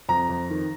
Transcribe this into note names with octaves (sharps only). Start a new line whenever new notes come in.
F2 A#5
F2
D#3